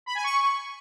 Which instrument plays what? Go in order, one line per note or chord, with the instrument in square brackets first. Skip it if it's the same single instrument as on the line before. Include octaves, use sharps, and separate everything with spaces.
[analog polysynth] B5
G#5
C#6